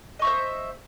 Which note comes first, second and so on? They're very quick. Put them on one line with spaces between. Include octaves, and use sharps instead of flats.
D#5 C#6 E5 C5